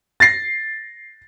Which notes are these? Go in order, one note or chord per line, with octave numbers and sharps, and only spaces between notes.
A6 A#6 C7